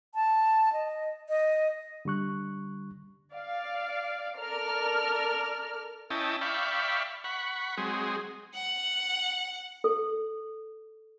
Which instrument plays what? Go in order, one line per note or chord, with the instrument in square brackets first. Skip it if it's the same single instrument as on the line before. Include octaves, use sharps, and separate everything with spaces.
[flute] A5
D#5
D#5
[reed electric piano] D3 G3 C#6 F#6
[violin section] D5 F5
A4 A#4 D5 F6
[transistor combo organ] C#4 E4 D#5 G5 A5
D5 E5 F5 G5 B5 C#6
F#5 B5 C#6
F#3 G#3 C4 G#4
[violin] F#5
[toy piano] A4